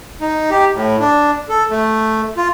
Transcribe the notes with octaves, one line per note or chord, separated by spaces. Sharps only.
D#4
G4
A2
D4
A4
A3
F4